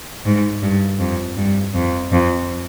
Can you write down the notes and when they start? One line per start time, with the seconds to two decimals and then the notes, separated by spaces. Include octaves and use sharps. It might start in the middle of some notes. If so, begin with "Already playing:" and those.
0.26 G#2
0.62 G2
1.00 F2
1.37 G2
1.75 F2
2.12 F2